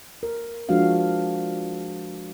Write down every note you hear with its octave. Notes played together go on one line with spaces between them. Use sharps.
A#4
F3 G#3 D4 F#4 F5